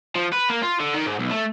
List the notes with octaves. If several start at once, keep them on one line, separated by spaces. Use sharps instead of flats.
F3
B4
A#3
F4
D3
D#3
G#2
B1
A3